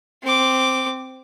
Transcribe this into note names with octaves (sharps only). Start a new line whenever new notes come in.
C4 D6